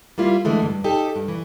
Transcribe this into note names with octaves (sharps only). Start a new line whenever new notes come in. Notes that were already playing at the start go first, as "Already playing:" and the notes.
G3 A#3 E4 F4
D3 E3 G#3 A3
G2
D#4 G4 A4
G2
E3